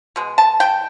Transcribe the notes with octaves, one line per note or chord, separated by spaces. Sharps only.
B2 G#3
A5
G5